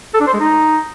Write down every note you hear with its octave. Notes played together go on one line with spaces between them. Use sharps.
A4
D4
C5
G#3
D#4